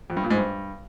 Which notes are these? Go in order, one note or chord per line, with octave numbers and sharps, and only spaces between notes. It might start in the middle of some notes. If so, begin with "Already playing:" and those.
F2
G2
A#2
G#2
G2